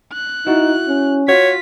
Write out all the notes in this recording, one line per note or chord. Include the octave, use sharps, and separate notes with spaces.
F#6
D#4 E4 F#4
C#4
F4 F#4 C#5 B6